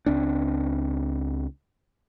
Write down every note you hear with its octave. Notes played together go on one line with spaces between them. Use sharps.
C#2 C4 D4